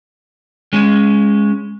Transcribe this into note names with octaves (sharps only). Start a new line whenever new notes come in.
G#3 C#4